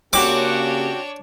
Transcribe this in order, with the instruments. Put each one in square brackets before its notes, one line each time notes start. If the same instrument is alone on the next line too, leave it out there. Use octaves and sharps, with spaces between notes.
[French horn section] C#3 A#3 G4 [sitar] C4 F#4 [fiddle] D4 C#5 [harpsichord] D6